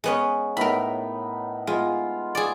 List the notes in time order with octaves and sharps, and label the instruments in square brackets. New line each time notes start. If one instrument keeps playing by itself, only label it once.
[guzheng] G#3 B3 C#4
[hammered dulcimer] A2 B3 D#4 [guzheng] A#4 B5
[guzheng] G#3 [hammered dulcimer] B3 F4
[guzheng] G#4 D5